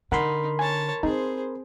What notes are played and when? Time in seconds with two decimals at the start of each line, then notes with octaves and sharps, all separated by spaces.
0.12 D3 D#4 A#4 F#5 B5 C6
0.59 C#5 G#5 A5
1.03 C4 D#4 G#4 C5